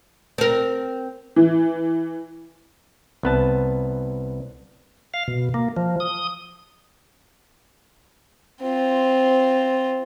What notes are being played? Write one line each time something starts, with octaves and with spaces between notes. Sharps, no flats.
C4 A#4
E3
C2 B3 A5
F5
B2
A#3
F3
D#6
C4 F4